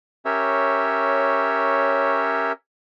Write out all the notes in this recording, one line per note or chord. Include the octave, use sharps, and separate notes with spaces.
C#4 G4 A#4 C#5 E5